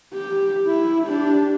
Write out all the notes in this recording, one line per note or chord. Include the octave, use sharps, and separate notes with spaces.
G4
E4
D4 G4